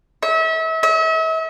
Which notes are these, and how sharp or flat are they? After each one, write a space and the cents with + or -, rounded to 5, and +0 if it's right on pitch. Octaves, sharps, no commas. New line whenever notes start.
E5 -35
E5 -40